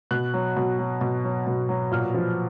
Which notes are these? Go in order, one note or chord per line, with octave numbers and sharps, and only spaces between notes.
B2 F#6
F#3
B2
F#3
B2
F#3
B2
F#3
A#2 F6
F3